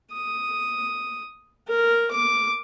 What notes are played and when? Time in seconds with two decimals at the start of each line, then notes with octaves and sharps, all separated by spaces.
0.12 D#6
1.68 A#4
2.11 D6